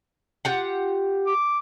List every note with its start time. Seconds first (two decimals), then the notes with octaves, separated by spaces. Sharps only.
0.45 F4 G4 F#5
1.26 D6